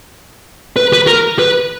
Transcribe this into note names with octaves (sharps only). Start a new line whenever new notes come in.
B4
B4
A#4
B4